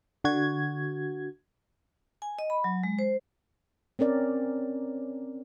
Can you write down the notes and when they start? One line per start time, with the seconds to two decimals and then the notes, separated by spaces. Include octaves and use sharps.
0.24 D3 F#4 G#6
2.22 G#5
2.39 D#5
2.50 B5
2.64 F#3
2.83 G#3
2.99 C5
3.99 C4 C#4 A#4 D5